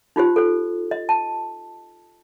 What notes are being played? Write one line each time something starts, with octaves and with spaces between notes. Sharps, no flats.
D#4 F4 G4 C5
A4 C5
D#5
A5